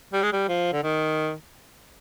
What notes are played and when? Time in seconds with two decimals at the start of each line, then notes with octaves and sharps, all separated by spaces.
0.13 G3
0.23 G#3
0.32 G3
0.48 F3
0.73 D3
0.83 D#3